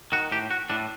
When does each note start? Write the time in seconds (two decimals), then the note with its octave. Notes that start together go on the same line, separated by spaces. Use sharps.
0.12 D#3 F#4
0.31 A2 G4
0.51 F#4
0.70 A2 D4